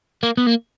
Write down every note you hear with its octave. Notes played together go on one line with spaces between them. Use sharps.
A#3
B3
A#3